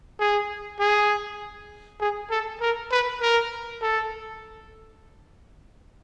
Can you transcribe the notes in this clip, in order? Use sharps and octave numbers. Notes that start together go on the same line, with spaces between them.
G#4
G#4
G#4
A4
A#4
B4
A#4
A4